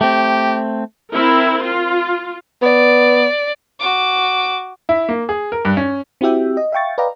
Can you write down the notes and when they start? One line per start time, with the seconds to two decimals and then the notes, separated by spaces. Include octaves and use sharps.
0.01 A3 C4 G4
1.12 C4 E4 A#4
1.63 F4
2.62 B3 D5
3.79 F#4 D6
4.89 E4
5.09 A#3
5.29 G#4
5.52 A#4
5.65 G2
5.77 C#4
6.21 C4 E4 F#4 G4 E5 G5
6.57 D#5
6.72 E5 F5 G5 C#6 A6
6.98 B4 D5 D#5 F5 G5 A#5